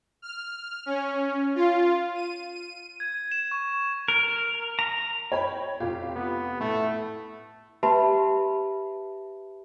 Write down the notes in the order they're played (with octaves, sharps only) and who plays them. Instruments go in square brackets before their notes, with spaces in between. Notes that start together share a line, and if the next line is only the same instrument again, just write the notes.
[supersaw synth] F6
C#4
F4
D#7
D#7
[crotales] G#6
E7
C#6
[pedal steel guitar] A#4
A#5
[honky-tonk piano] C#5 G5 B5
F1 F4 G4
[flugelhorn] B3
[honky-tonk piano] A2 [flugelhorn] A3
[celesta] G4 B4 E5 A5 B5